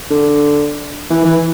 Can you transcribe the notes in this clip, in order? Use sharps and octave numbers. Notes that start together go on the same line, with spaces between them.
D3
E3
E3